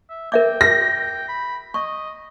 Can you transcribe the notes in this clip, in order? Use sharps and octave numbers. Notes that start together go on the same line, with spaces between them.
E5
A#4 E5 G5 D6
A#6
B5
D#5 C#6